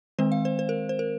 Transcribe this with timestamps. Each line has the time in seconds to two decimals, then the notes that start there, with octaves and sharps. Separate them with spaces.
0.19 D#3 G#3 C4 C5
0.32 F5
0.45 C5
0.59 C5
0.69 A#4
0.89 C5
0.99 A#4